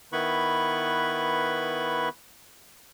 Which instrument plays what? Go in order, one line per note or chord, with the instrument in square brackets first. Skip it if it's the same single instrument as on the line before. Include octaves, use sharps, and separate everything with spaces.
[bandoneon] D#3 B3 E4 B4 B5 C#6